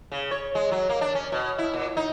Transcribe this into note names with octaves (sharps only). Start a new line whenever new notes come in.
C#3
C#5
G#3
F#3
A#3
D4
C#4
B2
E4
A#2
D#4